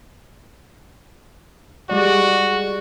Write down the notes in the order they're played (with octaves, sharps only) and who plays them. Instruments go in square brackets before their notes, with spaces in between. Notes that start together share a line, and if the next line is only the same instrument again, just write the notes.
[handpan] G3 G#3 D5 [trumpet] F#4